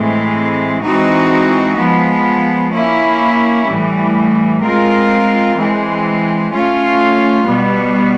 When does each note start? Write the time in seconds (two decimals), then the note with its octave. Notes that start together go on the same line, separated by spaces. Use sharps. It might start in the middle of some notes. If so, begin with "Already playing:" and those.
Already playing: A2 E3 G#3 C4
0.82 E3 G#3 C4 D#4 F#4
1.77 F3 G#3 B3
2.72 A#3 C#4 E4
3.67 A2 E3 G3
4.61 G#3 C4 F4 A#4
5.56 E3 G#3 C4
6.51 A3 C#4 F4
7.45 B2 G3 B3